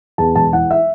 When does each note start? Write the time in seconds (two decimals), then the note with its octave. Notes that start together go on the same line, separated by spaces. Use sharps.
0.18 E2 A5
0.35 E1 A5
0.53 E3 F#5
0.71 E5